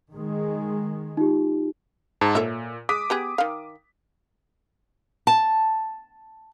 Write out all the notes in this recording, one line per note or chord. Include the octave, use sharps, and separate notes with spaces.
D#3 G#3
D#4 F4 G4
G#2 A5 A#5
A#2 A4 C#5 E5
G#3 D6 D#6 B6
B3 G4 G#4
D#3 F5
A5